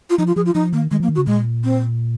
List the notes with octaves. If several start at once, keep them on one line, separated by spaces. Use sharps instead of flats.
F4
F3 D#4
F4
F3 G#4
F4
F3 D#4
D#3 A#3
D#3 G#3
F3 A#3
D#3
C#3 F#4
A#2 G#3
C4